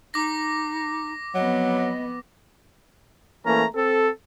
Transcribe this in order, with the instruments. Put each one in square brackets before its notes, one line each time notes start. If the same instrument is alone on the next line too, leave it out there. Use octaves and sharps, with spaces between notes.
[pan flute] D#4 [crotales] D6 A#6
[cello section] F2 B3 [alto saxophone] F#3 [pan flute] D#5
[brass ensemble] E3 A3 A#3 C#4 A#5
C4 A4